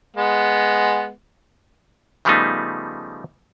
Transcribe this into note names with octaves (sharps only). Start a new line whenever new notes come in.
G#3 B3
C#3 F3 G3 A3 B3 D#4